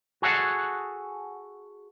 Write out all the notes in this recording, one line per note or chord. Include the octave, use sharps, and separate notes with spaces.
F#4 G#4 A4 F#5